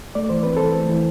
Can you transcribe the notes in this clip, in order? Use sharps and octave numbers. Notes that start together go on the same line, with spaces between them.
A3 D5
E3 C5
C4 B4
E3 A4 C5
A3
E3